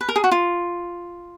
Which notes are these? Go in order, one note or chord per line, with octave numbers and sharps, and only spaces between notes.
B4
A#4
G#4
F#4
F4